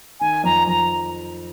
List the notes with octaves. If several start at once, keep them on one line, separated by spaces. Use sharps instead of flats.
D#3 G#5
F2 A#5
F2 A#5